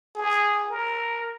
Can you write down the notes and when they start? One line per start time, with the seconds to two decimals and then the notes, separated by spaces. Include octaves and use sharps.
0.16 G#4
0.71 A#4